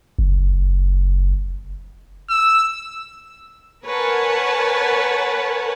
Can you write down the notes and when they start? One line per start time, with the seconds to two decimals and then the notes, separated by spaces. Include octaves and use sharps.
0.19 F#1
2.30 E6
3.85 A#4 B4 C#5 F#5 G#5 A5